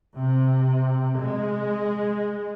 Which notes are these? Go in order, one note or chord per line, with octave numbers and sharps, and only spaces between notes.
C3
G#3